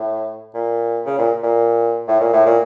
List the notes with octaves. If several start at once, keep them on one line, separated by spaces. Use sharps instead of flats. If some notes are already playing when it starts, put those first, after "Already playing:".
Already playing: A2
A#2
C#3
A#2
A#2
A2
A#2
A2
A#2